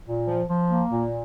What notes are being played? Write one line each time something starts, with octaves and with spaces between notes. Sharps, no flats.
A#2
F3
F3
A#3
A#2